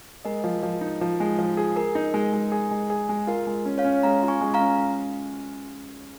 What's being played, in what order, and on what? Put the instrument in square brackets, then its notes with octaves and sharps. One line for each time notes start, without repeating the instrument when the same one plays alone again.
[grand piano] G#3 [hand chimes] A#4 D#5
[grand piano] F3
F3
D#4
F3
G#3
F3
G#4
[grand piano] G#4 [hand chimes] A#4
[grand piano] D#4
G#3
G#3
G#4
G#3
G#4
G#3
[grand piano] F4 [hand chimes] A#4
[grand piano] G#3
C#4
[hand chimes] C#5 F5
[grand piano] C#4
[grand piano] G#3 [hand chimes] F5 A#5
[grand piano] F4
[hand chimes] G#5 C#6
[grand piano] G#3
[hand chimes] F5 A#5
[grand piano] C#4